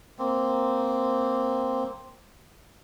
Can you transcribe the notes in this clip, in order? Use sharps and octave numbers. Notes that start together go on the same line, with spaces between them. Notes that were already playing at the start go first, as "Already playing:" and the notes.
A#3 C4